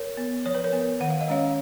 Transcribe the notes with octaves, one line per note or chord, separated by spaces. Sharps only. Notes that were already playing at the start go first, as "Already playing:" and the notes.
Already playing: A#4 C#5
B3
F3 C#5
B4
A#4 C#5
B3
D#3 F#5
F5
D#5
G#3 C#4 C#5 F5